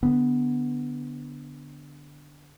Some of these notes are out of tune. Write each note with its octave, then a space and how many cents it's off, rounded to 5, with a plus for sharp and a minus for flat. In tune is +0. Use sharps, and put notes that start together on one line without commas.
D3 -5 B3 +0